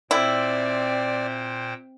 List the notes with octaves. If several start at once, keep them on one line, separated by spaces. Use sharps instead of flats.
A#2 C4 E4 C5 D5 E5 G5